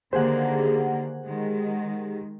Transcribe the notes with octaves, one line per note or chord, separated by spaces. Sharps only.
D3 D#3 A#3 G4 G#4 C5 F#5
D#3 G#3